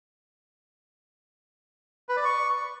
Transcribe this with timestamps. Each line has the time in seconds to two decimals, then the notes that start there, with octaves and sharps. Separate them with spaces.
2.09 B4
2.17 D5
2.25 C#6